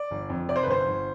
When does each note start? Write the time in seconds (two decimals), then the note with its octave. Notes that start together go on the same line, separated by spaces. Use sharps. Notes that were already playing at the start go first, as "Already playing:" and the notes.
Already playing: D5
0.11 G1
0.30 F2
0.49 C3 D5
0.56 C5
0.63 B4
0.67 G1 C5
0.86 G1